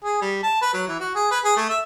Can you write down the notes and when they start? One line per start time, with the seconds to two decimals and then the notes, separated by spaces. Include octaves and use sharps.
0.05 G#4
0.21 G3
0.43 A5
0.61 B4
0.73 F#3
0.88 E3
1.00 F#4
1.15 G#4
1.31 B4
1.44 G#4
1.57 A3
1.69 E5